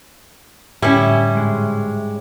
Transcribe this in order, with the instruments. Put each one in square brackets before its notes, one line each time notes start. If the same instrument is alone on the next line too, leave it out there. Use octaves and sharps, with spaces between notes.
[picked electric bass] A2 D3 [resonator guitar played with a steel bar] G3 C#4 [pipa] E4
[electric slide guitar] G#2 G#3